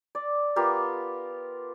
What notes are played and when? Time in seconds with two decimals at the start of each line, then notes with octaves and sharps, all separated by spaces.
0.15 D5
0.56 B3 F4 G4 A#4